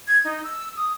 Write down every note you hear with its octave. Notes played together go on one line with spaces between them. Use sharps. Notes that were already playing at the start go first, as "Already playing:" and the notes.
G#6
D#4
E6
D#6